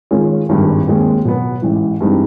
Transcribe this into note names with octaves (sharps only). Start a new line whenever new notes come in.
D#3 G#3 C#4 F4
G#1 G2 D#3 G#3
D#2 D#3 G#3 C4
B2 F#3 B3
A1 G#2 E3
G2 E3 G#3 C4 D#4